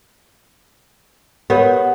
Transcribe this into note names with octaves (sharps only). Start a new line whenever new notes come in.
B3 G4 A#4 C#5